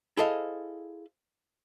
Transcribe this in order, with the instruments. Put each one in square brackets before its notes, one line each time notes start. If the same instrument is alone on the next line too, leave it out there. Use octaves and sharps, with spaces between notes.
[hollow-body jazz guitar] E4 G#4 A4 C5 D#5 F5